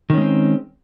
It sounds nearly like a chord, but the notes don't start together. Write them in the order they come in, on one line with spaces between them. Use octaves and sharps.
D#3 C#4 G#3 C4